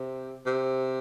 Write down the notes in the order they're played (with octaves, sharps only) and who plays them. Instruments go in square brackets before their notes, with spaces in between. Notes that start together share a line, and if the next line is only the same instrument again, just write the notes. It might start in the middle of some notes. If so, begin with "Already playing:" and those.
Already playing: [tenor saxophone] C3
C3